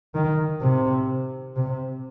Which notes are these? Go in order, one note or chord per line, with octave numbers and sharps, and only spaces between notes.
D#3
C3
C3